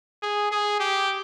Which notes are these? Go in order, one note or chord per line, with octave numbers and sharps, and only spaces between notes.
G#4
G#4
G4